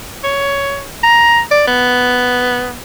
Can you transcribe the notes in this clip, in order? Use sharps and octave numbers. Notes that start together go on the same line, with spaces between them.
C#5
A#5
D5
B3